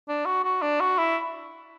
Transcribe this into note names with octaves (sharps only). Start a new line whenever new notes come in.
D4
F#4
F#4
D4
F#4
E4